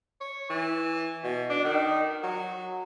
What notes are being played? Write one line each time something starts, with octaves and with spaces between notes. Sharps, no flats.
C#5
E3
B2
D4
D#3
F#3